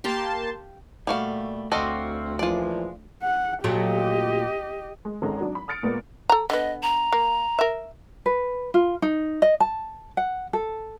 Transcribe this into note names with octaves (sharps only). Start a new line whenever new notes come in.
A#3 G4 F5 G5 A5 C6
A#2 G3 A3 F#4 F5
D2 C4 F4 F#4 A4 D5 D#5
A#2 E3 F3 G#3 F4 D5
F#5
A#2 F#3 A3 G4 D#5
G#3
G#1 G#3 C#4 A4 A#5
F#3 D4
B5
D#6 F6 A6 C#7 D7
A#2 G#3 A#3 B3
A4 A#5
D3 B3 D#5
A#5
A#3
A#4 E5
B4
F4
D#4
D#5
A5
F#5
A4